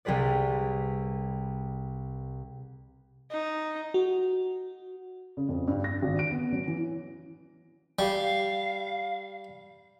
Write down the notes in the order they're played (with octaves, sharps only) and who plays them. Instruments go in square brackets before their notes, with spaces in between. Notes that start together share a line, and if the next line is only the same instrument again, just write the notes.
[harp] C2 G3 G#4 B4 D5
[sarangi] D#4
[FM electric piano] F#4
[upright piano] C#3
F2
G2
A#6
G#1
D7
B3
F#3
E3
[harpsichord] G3 [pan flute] F5